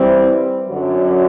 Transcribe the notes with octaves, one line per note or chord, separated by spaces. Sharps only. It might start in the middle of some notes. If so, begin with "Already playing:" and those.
Already playing: E3 G3 C4
F#2 D3 F#3